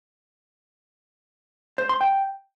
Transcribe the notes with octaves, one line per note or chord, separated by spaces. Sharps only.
C5
C6
G5